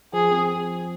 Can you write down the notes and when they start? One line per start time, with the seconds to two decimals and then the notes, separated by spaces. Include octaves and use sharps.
0.13 F3 G#4
0.31 C4